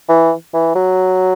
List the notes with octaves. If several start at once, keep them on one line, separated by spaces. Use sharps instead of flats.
E3
E3
F#3